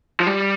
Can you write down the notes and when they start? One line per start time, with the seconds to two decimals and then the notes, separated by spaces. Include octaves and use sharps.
0.20 F3
0.27 G3